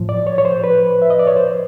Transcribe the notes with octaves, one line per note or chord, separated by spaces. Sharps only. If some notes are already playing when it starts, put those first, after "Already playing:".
Already playing: A2 F3
D5
C#5
C#5
C5
B4
E5
D#5
D5
C#5
C5